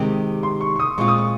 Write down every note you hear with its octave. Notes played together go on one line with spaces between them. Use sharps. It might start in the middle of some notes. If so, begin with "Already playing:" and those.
Already playing: C3 D#3 G#3 C4 G4
C6
C#6
C#6
D#6
A#2 G#3 C4 F4 C#6
D#6
C#6